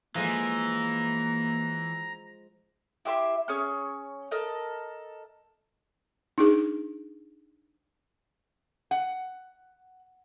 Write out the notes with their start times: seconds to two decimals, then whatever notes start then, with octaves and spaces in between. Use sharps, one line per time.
0.15 E3 F3 G#3 A#3 A#5
3.05 E4 G4 E5 C6
3.48 C#4 G#4 C#5 F6
4.31 A4 A#4 D#5
6.38 D4 D#4 G#4
8.91 F#5